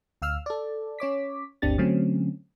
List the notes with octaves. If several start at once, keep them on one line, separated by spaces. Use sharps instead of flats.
D2 F5 E6 F6
A4 D5
C#4 C#5 D6 B6
G1 D2 C4 D4 G4 A6
D3 F#3 A3 C4 C#4